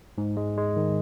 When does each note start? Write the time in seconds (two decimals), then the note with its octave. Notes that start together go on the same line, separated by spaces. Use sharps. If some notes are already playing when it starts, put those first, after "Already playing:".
0.18 G#2
0.37 G#3
0.57 G#3
0.77 D#3